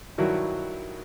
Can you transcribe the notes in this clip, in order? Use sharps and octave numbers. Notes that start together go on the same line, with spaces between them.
G2 D#3 F#3 E4 F#4